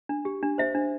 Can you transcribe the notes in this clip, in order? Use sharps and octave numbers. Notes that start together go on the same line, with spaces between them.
D4
G4
D4
C5 E5
D4